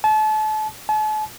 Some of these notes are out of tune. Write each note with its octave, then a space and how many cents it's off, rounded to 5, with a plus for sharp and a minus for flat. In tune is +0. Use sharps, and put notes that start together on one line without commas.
A5 -35
A5 -45